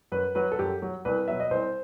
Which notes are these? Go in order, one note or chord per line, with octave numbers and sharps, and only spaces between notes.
F#2 B4
F#3 B4
A4
F#2 G4
F#3
C2 B4
B2 F#3 E5
D#5
C2 C5